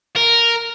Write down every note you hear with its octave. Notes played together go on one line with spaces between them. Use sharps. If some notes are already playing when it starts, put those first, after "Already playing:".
A#4